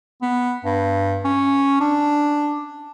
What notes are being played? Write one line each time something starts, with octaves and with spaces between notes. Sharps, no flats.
B3
G2
C#4
D4